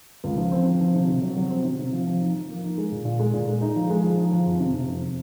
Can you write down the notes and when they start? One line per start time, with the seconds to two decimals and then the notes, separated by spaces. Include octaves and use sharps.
0.24 C#2
0.38 F3
0.52 C4
0.66 F3
0.80 F3
0.95 C3
1.08 C3
1.22 F#3
1.36 F#3
1.50 C4
1.64 C3
1.79 C3
1.93 F3
2.07 F3
2.20 D#4
2.34 F3
2.49 A#3
2.64 D#4
2.78 G#3
2.92 A#2
3.05 A#2
3.19 G#3
3.33 A#2
3.48 G#3
3.61 D#4
3.76 F3
3.90 G#3
4.03 F3
4.17 D#4
4.32 F3
4.46 F2
4.60 C3
4.74 C3
4.88 F2